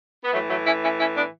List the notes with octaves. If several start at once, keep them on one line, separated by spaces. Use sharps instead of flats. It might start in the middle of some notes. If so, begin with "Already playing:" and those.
B3
A2 E3 F#3 A3
F#3 A3
C#4 E4
C#4 E4
C#4 E4
B3 D4